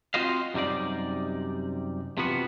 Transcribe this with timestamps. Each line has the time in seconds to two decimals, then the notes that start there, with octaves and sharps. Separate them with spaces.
0.14 C4 F4 F#4 C5 D#5 F5
0.54 F#2 C3 G3 D#4 D5
2.18 C3 E3 F3 B3 F#4